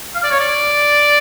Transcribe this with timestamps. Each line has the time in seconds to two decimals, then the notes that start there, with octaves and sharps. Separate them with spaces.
0.15 F5
0.24 D5
0.31 C#5
0.40 D5